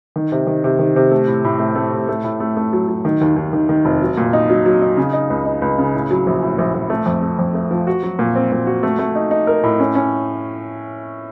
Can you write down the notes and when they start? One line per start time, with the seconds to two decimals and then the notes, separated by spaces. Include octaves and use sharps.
0.16 D#3
0.32 C3
0.47 D#3
0.64 C3
0.79 D#3
0.96 C3
1.11 A3
1.27 A2
1.44 A2
1.59 A3
1.75 A3
1.92 A2
2.09 A3
2.24 A2
2.40 A3
2.57 A3
2.73 F#3
2.88 F#3
3.05 D#3
3.21 D#2
3.36 D#2
3.53 D#3
3.69 D#3
3.85 F1
4.02 F#3
4.17 A#2
4.33 D#4
4.50 F#3
4.66 F#3
4.82 D#4
4.97 C#3
5.13 D#4
5.30 C#2
5.45 D#4
5.62 C#2
5.78 C#3
5.94 A2
6.11 F#3
6.27 A#1
6.43 A2
6.58 A#1
6.75 A#1
6.90 A3
7.06 F2
7.22 A3
7.39 F2
7.55 A3
7.71 F3
7.87 F#4
8.03 F#3
8.19 A#2
8.35 C4
8.52 A#2
8.67 F#4
8.83 A3
8.99 A3
9.15 D#4
9.31 D#4
9.47 A#4
9.63 A2
9.80 C#4
9.95 C#4